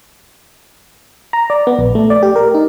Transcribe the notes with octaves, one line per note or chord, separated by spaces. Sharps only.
A#5
D5
B3
A#1
A3
D5
G4
A#4
D#4